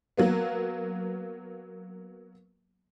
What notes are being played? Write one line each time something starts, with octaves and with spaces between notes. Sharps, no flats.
F#3 A#3 B3